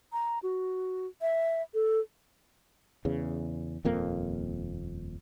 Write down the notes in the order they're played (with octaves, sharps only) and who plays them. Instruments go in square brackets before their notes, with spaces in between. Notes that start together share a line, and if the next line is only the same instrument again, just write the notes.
[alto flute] A#5
F#4
E5
A4
[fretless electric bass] E2 C#3
D#1 F2 A#3